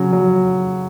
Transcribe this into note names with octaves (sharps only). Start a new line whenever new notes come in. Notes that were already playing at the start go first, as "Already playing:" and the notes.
Already playing: C#3 F#3
F#3